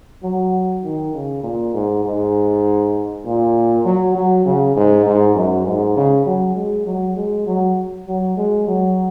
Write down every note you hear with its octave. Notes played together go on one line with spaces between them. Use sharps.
F#3
D#3
C#3
A#2
G#2
G#2
A#2
F#3
F#3
C#3
G#2
G#2
F#2
G#2
C#3
F#3
G#3
F#3
G#3
F#3
F#3
G#3
F#3